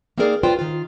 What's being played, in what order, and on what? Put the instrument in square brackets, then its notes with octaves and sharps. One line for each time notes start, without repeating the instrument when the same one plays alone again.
[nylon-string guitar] A#3 C4 D#4 G#4 A#4 D5
F4 B4 C5 D5 G5
D#3 F4